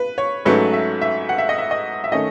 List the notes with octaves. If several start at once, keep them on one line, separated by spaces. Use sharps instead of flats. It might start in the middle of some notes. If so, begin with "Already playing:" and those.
Already playing: B4
C#5
G#2 F#3 A3 C#4 B4
E5
E5
F#5
E5
D#5
E5
D#5
E5
D#3 A3 C#4 D#5